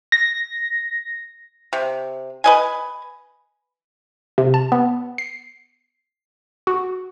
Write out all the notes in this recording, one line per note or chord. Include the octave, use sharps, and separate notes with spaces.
A#6
C3
B4 D#5 G#5
C3
A5
B3
C7
F#4